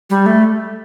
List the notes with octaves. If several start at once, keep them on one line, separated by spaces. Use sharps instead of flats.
G3
A3